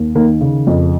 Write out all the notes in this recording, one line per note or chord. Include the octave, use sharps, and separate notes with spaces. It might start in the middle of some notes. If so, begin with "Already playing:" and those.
Already playing: D#2
D#3 A#3
C#3
F2